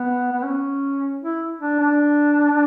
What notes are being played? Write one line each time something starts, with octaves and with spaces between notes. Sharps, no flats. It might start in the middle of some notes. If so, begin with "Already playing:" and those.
Already playing: B3
B3
C#4
E4
D4
D4